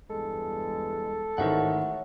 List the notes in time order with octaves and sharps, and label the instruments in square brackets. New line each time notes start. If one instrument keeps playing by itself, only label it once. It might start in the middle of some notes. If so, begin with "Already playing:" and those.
[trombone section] E2 G2 G#3 [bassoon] A4
[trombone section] A1 [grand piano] G#2 D#3 [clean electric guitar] C#5 E5 F#5